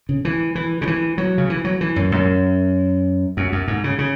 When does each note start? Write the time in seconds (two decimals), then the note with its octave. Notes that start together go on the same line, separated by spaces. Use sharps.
0.09 C#3
0.25 E3
0.55 E3
0.81 C#3
0.87 E3
1.18 F#3
1.38 C#3
1.50 E3
1.64 F#3
1.81 E3
1.96 F#2
2.12 F#2
3.37 F#2
3.52 F#2
3.68 G#2
3.84 C#3
3.98 C#3